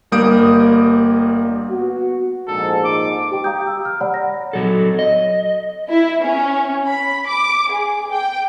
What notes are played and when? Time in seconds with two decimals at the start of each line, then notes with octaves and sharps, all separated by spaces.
0.12 G1 G3 A#3 D#6 G6 D7
1.70 B3 F#4
2.47 A#1 F2 G#2 A4
2.84 D6
3.31 G4 G5
3.44 F5 G5 A#5 D6 D#6 G6
3.66 G4 E6
3.85 F6
4.01 C#5 D5 F#5 A#5 B5
4.14 A#6
4.53 F#3 A4
4.99 D#5
5.90 E4
6.23 C#4
6.87 B5
7.27 D6
7.70 G#4
8.11 G5